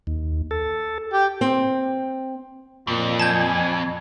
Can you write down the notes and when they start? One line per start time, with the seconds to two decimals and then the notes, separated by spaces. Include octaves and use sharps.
0.07 D#2
0.51 A4
1.13 G4 G5
1.41 C4
2.87 F2 A#2
3.20 G#5 A5 G6